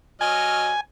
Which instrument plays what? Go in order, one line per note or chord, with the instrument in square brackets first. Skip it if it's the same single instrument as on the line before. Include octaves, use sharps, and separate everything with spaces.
[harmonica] F#3 D#5 F6 [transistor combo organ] G#5